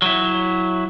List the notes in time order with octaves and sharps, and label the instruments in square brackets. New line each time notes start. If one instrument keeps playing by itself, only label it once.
[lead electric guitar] F#3 E4